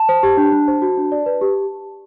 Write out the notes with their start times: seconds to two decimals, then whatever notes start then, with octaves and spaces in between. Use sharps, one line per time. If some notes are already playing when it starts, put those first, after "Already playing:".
Already playing: A5
0.09 C5
0.23 G4
0.37 D4
0.52 D4
0.68 C5
0.82 F#4
0.97 D4
1.12 D5
1.26 B4
1.41 G4